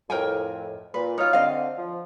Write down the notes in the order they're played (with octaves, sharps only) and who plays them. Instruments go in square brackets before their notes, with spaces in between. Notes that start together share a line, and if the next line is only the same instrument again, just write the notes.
[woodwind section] F2 A2 [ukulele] A#4 G5 G#5
[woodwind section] A#2 [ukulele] B4
[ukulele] D#4 F4 [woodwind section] C#5 F6
[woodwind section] D3 C4 [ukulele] D#5 F5
[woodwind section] F3